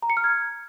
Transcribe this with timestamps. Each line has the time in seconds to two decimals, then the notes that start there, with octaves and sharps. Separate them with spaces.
0.02 A#5
0.10 C#7
0.17 F6
0.24 G#6